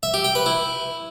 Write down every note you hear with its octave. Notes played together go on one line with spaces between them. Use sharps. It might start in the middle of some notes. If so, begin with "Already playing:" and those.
E5
G4
G5
B4
E4